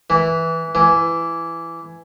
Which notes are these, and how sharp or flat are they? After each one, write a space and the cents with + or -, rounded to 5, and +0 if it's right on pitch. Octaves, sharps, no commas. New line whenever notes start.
E3 -5
E3 +15